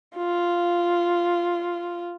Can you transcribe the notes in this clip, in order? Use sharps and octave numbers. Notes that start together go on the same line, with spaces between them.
F4